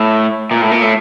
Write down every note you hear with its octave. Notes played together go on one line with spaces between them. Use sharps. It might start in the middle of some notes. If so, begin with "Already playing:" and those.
Already playing: A2
A#2
A2
A#2
A2